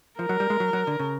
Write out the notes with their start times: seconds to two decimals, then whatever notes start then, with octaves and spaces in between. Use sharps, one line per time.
0.19 F3 A#4
0.29 F#3
0.40 G3
0.50 G#3
0.60 F#3
0.73 F#3
0.87 D3
0.99 C#3